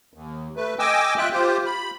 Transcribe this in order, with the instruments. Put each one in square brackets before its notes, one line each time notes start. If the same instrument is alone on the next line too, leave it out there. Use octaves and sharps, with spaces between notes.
[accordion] D#2
A3 B4
D#5 G5 G#5 D6 E6
F4 E5 G5 F#6
F4 G4 C5
B5